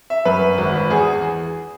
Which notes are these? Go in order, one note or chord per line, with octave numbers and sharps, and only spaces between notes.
E5
F#2 B4
G#1
E2 G#4